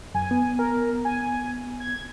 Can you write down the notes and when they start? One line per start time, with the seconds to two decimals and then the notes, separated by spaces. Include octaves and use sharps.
0.15 F#2 G#5
0.31 B3
0.59 A#4
1.05 G#5
1.80 G#6